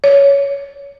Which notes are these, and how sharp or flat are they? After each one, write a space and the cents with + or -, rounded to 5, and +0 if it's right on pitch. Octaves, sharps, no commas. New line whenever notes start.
C#5 +15